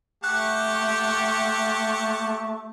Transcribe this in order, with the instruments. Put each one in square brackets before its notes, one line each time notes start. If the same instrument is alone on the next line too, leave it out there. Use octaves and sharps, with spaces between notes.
[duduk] A3 [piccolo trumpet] G4 [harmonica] F#5 A5 C#6 [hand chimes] F#6